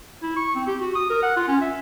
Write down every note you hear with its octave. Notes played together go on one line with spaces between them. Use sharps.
E4
C#6
C4
G4
F#4
D#6
A#4
F#5
F4
C#4
E5